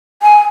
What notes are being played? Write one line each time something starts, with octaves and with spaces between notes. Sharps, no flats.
G#5